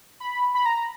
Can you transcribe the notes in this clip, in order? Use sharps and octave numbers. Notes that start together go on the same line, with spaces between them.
B5
B5
A#5